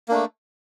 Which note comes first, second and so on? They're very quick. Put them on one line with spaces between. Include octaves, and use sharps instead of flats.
A#3 D4 A3